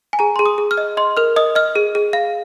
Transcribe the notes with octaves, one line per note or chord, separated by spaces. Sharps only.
G#5
G#4 A#5
G#4 C6
D#6
G#4
F6
D#5
D#5 C6
A#4 F6
D#5 D#6
D#5 F6
G#4
G#4
F5